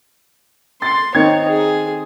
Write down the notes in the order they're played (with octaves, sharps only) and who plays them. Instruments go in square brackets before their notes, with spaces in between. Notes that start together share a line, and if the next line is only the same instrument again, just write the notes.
[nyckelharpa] C6 [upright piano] A6 C7
[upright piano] D#3 C4 G#6 [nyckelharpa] D#4 C#5
[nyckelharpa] G#4